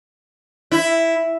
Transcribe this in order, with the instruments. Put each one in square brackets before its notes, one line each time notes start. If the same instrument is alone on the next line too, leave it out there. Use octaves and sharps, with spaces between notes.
[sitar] E4